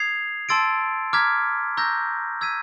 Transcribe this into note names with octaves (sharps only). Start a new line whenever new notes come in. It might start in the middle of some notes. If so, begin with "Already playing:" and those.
Already playing: D#6 G#6 C7 F7
A5 C6 E6 A6 D7
A#5 D6 F6 G#6 B6
A#5 C#6 E6 G6 A#6
E6 G#6 B6 D#7